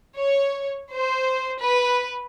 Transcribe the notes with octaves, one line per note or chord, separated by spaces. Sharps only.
C#5
C5
B4